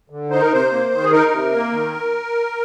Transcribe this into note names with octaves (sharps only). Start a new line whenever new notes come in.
D3
D#4 C5
A#4
C3 C5
A#3
D#3
G#4
D#4 A#4
C3
A#3
D#3